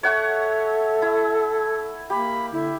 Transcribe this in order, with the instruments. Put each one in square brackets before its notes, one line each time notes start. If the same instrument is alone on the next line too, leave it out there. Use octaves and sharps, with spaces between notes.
[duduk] A4 [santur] C#5 F#5 C#6 [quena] E5
[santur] E4
[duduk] A#3 [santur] G4 [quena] B5
[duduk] D3 [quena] E4